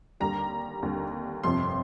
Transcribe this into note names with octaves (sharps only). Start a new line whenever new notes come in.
D#2 D3 G3 A#5
D#2 D3 G3
G1 F2 C3 F3 C6